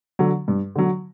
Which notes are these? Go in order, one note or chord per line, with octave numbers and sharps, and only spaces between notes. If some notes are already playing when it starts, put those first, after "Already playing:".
D3 F#3
G2
D3 F#3